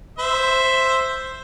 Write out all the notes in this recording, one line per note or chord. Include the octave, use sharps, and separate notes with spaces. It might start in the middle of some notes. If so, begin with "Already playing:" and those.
C5 E5